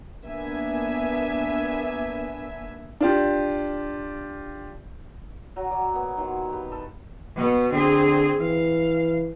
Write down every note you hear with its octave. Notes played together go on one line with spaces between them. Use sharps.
A#3 B3 D4 E5 G#5
D4 F4 G4
F#3 F#4
D5
A#3 B3
D#3 F#3 F4 G#5
G4 B4
A4
B2 B3
D3 C4 G#4
E3 F5